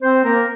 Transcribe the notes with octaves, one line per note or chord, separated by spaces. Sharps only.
C4 C5
A#3 A#4